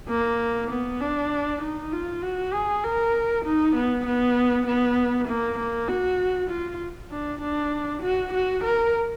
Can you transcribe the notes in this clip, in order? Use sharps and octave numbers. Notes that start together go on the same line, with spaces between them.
A#3
B3
D4
D#4
F4
F#4
G#4
A#4
D#4
B3
B3
B3
A#3
A#3
F#4
F4
D4
D4
F#4
F#4
A#4